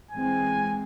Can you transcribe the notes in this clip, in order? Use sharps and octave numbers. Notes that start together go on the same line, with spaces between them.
E3 G#3 C4 G#5